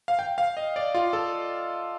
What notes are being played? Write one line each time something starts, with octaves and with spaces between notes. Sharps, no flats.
F5
G5
F5
D#5
D5
F4
A4